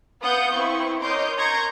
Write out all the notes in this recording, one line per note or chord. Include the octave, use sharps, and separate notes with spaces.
B3 F5 F#5 D#6 G6
C4 E4 B4 C#6
A#4 C#5 D#5 C6 D6 G6
A#5 C6 C#6 G6 G#6 A#6